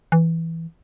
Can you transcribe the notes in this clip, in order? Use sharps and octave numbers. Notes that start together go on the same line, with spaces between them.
E3